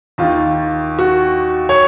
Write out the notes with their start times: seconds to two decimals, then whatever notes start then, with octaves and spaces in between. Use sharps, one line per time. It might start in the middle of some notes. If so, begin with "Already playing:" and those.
0.18 D#2 D#3 F4
0.99 F#4
1.69 C#5